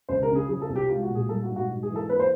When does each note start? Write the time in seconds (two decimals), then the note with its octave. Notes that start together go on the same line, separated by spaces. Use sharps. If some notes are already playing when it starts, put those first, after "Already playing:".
0.09 C#2 C5
0.22 A#4
0.29 C#3
0.35 G#4
0.48 F3 G#4
0.62 A4
0.69 C2
0.76 G4
0.89 G#3 F4
1.03 F#4
1.09 A#2
1.15 G#4
1.29 G3 A4
1.42 F#4
1.49 G#2
1.56 F#4
1.69 G#2
1.83 G#4
1.90 E3
1.96 A4
2.09 A#3 B4
2.19 C5